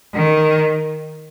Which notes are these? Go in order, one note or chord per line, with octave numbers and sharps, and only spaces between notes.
D#3